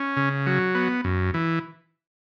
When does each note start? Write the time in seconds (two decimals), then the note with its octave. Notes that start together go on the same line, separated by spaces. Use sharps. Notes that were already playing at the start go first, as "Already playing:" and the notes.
Already playing: C#4
0.17 C#3
0.46 F#3
0.75 B3
1.04 F#2
1.34 E3